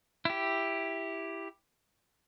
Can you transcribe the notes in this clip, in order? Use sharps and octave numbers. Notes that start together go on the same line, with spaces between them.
E4 G4